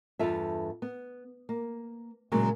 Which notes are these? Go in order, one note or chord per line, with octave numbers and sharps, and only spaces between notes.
E2 G2 F4 A4 E5
B3
A#3
A#2 C#3 F#3 G#3 A#3